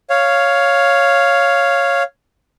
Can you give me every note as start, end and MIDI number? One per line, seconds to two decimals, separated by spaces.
0.10 2.03 73
0.10 2.03 77